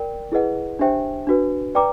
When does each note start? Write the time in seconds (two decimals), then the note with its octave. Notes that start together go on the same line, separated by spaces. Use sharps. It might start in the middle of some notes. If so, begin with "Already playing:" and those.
Already playing: A#4 D5 G5
0.32 E4 G#4 B4 D#5 F#5
0.79 D4 G4 C5 E5 G5
1.27 D4 F#4 B4
1.75 B4 D5 G5 A#5 D6